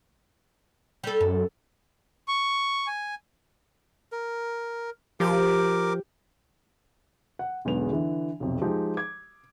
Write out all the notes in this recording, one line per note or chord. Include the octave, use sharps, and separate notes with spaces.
G3 A4
F#2 A4
C#6
G#5
A#4
F3 G4 A#4 D6
F#5
B1 E2 D3 G#3 B3 F7
D3 E3
B1 F2 C3
F3 G#3 D#4 G4 G#4
D6 G#6